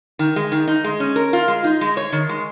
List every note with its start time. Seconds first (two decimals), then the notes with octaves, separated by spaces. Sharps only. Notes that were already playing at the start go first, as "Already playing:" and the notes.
0.19 D#3
0.36 G#3
0.52 D#3
0.68 D#4
0.84 G#3
1.00 C#4
1.16 A#4
1.33 F4
1.48 G#3
1.64 D#4
1.81 G#3
1.97 C#5
2.12 D#3
2.29 G#3